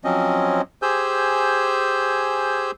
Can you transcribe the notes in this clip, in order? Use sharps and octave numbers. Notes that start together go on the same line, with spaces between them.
F3 F#3 C4 C#4 D#5
G4 G#4 C5 G#5 E6 G6